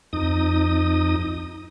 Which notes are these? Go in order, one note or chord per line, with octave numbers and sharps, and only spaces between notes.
F2 D#4 D#6